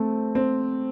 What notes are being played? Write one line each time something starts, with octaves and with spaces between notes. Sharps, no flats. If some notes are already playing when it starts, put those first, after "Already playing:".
Already playing: A3 C4
C4